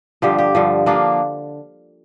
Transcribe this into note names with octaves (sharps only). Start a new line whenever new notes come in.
G2 D3 F3 G4
G4
G2 D3 F3
F3 A#3 D4 F4